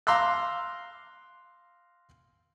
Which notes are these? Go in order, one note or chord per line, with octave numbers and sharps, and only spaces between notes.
F5 A#5 C6 D6 E6 F#6